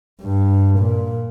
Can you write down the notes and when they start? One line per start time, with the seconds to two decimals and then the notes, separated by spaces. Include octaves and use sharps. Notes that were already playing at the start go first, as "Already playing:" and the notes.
0.22 G2
0.79 A#2